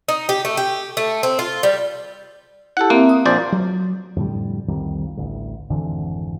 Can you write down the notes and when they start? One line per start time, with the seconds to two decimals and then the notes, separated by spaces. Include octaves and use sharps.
0.08 D#4
0.29 G4
0.45 A3
0.57 G4
0.97 A3
1.23 C4
1.39 F4
1.63 G3
2.77 E4 G4 A4 F#5
2.90 A#3 C4 E5
3.09 D#6
3.26 A#1 F4 C5 D5
3.52 F#3
4.16 F2 A2 D3 G3
4.68 C2 F2 D#3 G3
5.17 A1 D2
5.70 G#1 F2 D3 E3